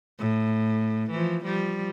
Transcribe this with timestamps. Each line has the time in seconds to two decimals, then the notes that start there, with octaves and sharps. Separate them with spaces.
0.19 A2
1.11 E3 F3
1.44 F3 G3